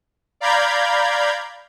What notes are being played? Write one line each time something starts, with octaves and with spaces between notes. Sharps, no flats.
D5 F5 A#5 B5 G6 G#6